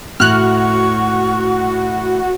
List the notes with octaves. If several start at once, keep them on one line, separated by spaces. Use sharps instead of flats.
A2 F#4 C#6 F6 F#6